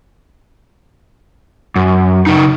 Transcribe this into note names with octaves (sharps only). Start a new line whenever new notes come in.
F#2
C#3 D#4